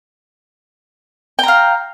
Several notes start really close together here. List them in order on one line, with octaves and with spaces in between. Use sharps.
G5 A#5 F5